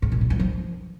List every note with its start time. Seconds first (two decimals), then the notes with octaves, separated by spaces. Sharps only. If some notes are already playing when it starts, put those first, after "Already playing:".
0.02 G#2
0.12 A#2
0.21 D3
0.30 G2
0.40 F3